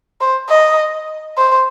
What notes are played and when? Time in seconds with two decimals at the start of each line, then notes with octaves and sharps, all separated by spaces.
0.21 C5
0.49 D#5
1.37 C5